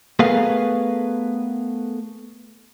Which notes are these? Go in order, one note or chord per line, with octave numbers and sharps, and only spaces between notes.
A3 B3 G#4 A#4 B4 F5